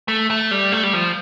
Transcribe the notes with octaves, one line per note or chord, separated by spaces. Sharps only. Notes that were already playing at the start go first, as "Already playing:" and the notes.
A3
A3
G3
A3
G3
F3